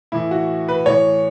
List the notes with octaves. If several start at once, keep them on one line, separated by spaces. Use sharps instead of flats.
A2 E3 E4
F#4
B4
A2 E3 C#5